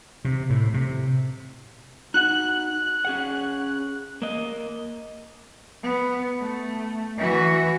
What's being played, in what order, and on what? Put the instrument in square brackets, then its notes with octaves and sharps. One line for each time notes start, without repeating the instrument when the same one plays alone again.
[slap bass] C3
A2
C3
[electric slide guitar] D#4 F#4 F#5 [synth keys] F#6
[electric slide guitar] C#4 G#4 F#5
A#3 D#5
[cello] B3
A3
E3 F#4